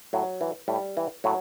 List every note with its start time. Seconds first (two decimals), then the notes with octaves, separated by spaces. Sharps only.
0.13 A2 F#3
0.41 E3
0.68 A2 G3
0.97 E3
1.24 A2 F#3